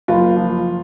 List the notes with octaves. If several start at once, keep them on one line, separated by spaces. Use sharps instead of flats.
F#1 F4
F3